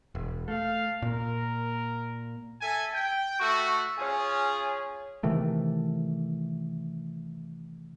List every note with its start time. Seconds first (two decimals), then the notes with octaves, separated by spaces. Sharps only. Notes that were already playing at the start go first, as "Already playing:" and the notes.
0.15 E1
0.48 A3 F5
1.02 A#2 A#4
2.61 A4 E5 G#5
2.94 G5
3.40 A3 F#4 C#6 E6
3.98 C#4 F4 G#4 C#5 G#5
5.23 C3 D#3 E3 A3